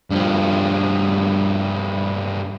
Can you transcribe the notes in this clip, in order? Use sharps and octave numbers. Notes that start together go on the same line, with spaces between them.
G2 F3